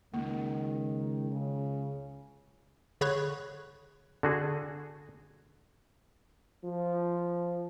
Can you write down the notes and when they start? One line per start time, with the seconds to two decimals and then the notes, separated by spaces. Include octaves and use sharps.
0.14 C#2 D#3 A#3
1.32 C#3
3.01 D3 G#4 C#5 B5 C#6 F#6
4.23 D3 F#4 G#4
6.64 F3